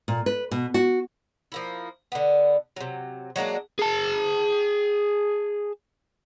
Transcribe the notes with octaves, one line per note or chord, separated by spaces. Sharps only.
A#2
B4
B2
F#4
F3 A#3 E4
D3 B3
C3 F#3
F#3 G#3 A#3 D4
G#4 A5